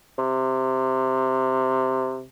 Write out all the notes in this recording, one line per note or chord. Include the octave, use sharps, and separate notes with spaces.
C3